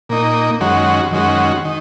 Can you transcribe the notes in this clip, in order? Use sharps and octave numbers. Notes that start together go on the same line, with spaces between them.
A#2 A#3 D#4
F#2 D#3 G#3 C#4 F#4
F#2 D#3 G#3 C#4 F#4
D#3